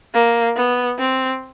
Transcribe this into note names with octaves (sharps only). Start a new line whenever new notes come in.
A#3
B3
C4